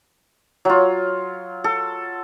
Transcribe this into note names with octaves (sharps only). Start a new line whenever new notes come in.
F#3 F4
A4